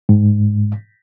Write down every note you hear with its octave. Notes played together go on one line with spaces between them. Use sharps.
G#2